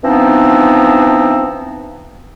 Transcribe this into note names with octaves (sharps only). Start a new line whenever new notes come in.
E3 F3 B3 C4 D4 D#4